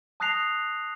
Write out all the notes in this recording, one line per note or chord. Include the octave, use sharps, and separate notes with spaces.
A5 D#6 F#6 A#6 C7 F7